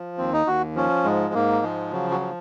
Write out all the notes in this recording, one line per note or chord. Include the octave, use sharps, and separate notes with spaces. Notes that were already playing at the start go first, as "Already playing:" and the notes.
Already playing: F3
D#2 C4
D#4
D#2 F#4
F3 C#4
G#2 G#3
G#2 A#3
F3 G#3
C#3 F#3
F#3
F3